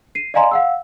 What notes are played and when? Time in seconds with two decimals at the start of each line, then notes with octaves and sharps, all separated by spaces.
0.15 C7 D#7
0.34 D5 D#5 F5 G#5 A#5 C6
0.51 F5 F#5 E6